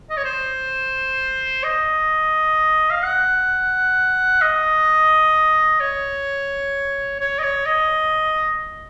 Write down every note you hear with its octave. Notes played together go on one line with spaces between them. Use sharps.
D#5
C#5
C5
D#5
F5
F#5
D#5
C#5
C#5
D#5
C#5
D#5